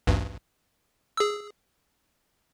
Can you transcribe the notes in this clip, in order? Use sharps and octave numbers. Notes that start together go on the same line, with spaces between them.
A1 D2 G2
G#4 E6